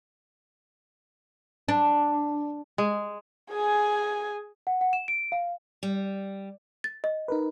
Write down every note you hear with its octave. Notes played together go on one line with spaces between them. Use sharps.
D4
G#3
G#4 G#5
F#5
F#5
E7
D7
F5
G3
A6
D#5
D#4 A#4 B4